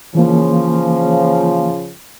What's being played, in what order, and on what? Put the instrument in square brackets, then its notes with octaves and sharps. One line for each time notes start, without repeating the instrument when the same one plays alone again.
[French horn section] C#3 F3 [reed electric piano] E3 A#3